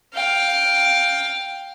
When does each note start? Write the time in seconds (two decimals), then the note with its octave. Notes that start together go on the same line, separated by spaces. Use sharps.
0.14 F5 G5